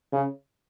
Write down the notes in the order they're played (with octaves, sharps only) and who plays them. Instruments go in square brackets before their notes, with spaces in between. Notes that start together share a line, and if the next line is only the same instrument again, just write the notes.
[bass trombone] C#3